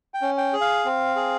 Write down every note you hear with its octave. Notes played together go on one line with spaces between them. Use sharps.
G5
C#4
G5
G#4
F5
C4
G#4